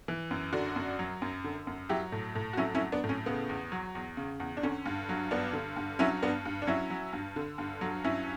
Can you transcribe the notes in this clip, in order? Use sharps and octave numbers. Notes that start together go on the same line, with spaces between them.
E3
F#2
D3 D4 F#4
F#2
F#3
F#2
D3
F#2
F#3 E4 G4
A2
A2
F#4
F#3 C#4 E4
C#4 E4
F#3
B3 D4
A2
C#4
C#3 B3
E2
F#3
E2
C#3
E2
D4
D3 C#4
G2
F#3
G2 B3 D4
D3
G2
F#3 C#4 E4
G2 B3 D4
G2
D4
F#3 C#4 E4
F#3
G2
D3
G2
F#3
G2 C#4 E4